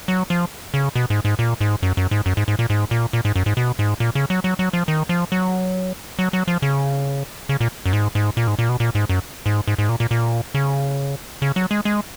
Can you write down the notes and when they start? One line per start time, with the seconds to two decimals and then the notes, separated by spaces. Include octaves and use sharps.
0.08 F#3
0.30 F3
0.74 C#3
0.95 B2
1.10 G#2
1.25 G#2
1.39 A#2
1.61 G#2
1.83 F#2
1.97 F#2
2.11 G#2
2.26 F#2
2.37 G#2
2.48 G#2
2.59 A#2
2.70 G#2
2.91 A#2
3.13 A#2
3.25 G#2
3.36 F#2
3.46 G#2
3.57 B2
3.79 G#2
4.00 A#2
4.15 C#3
4.30 F#3
4.44 F#3
4.59 F#3
4.73 F3
4.88 D#3
5.09 F3
5.32 F#3
6.19 F#3
6.33 F#3
6.48 F3
6.62 C#3
7.49 C#3
7.61 A#2
7.86 F#2
7.93 G#2
8.15 G#2
8.37 A#2
8.47 G#2
8.59 A#2
8.69 B2
8.80 A#2
8.95 G#2
9.09 F#2
9.46 G#2
9.67 G#2
9.78 G#2
9.89 A#2
10.00 A#2
10.11 A#2
10.55 C#3
11.42 C#3
11.56 F#3
11.71 G#3
11.85 G#3